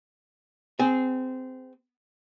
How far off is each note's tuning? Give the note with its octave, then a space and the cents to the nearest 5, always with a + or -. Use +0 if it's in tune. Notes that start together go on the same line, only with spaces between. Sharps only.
C4 -20 G#4 +0 G#5 +0